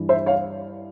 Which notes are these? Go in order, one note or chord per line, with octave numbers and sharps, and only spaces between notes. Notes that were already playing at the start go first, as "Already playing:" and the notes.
Already playing: G2 E3
C5 E5
C#5 F5